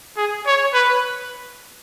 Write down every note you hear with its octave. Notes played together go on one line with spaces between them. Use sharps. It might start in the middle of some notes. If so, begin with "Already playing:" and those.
G#4
C#5
B4